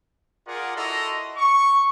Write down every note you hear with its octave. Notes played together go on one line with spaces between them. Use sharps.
F4 G#4 A#4 D5 F#5
E4 F#4 A4 D#5 A#5 C6
C#6